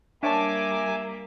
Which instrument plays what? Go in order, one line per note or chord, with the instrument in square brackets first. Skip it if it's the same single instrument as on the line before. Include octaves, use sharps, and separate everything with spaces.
[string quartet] G3 A#3 [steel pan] D4 C#5 A5 [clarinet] E5 [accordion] G#5 D6